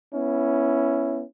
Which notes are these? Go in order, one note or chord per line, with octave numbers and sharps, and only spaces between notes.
B3 C#4 E4